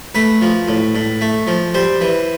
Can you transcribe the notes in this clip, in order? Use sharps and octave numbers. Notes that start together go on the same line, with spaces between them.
A3 B4
F3
A2
A2
A3
F3
G3 C5
E3